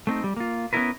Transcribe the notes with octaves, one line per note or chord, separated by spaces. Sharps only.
A3 C4 D#4
G3
A#3 F4
B3 C#4 D#4 E4 A#4 B4